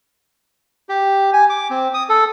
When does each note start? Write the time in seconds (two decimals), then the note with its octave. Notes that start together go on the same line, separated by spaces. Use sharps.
0.89 G4
1.33 G#5
1.49 D6
1.70 C4
1.94 D#6
2.09 A4